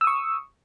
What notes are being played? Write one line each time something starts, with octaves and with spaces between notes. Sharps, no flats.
C#6 D#6 E6